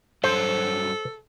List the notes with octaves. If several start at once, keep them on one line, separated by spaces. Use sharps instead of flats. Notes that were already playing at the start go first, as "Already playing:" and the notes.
G2 F#3 A4 C5